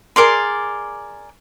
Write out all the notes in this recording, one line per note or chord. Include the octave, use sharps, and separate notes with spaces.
G#4 A#4 D5 C6